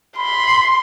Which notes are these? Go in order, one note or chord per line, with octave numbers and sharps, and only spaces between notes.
B5 C6